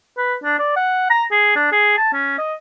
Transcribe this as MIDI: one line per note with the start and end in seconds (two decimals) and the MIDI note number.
0.17 0.34 71
0.43 0.58 62
0.59 0.74 74
0.76 1.09 78
1.10 1.24 82
1.31 1.54 68
1.56 1.68 62
1.72 1.92 68
1.97 2.09 81
2.13 2.35 61
2.38 2.54 75